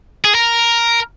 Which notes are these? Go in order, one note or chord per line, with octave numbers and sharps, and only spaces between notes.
G#4
A#4